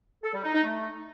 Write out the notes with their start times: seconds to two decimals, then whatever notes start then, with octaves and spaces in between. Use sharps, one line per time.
0.24 A4
0.34 G3
0.44 D#4
0.54 D#4
0.64 A3